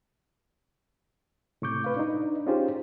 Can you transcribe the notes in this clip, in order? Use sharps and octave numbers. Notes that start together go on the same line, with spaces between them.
A2 C3 C#6 D6 G6
B4 F5
D4 D#4
C#4 D#4 F4 G4 G#4 C5